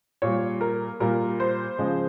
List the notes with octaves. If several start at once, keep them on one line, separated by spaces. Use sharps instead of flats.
A#2 G3 C#5
A#4
A#2 G3 A#4
C5
C#3 F3 G#3